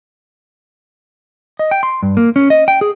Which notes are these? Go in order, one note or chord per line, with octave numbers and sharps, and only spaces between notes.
D#5
G5
C6
G2
A#3
C#4
D#5
G5
G#4